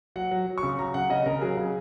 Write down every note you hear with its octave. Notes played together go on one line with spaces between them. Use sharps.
F#3 F#5
F#3
F#3
C#6
C#3
F#3 A#5
C#3 F#5
C#3 D#5
C#3 A#4
F#3 G#4
C#3